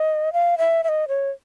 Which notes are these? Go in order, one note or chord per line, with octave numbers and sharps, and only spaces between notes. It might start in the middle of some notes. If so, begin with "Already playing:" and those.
Already playing: D#5
F5
E5
E5
D#5
C#5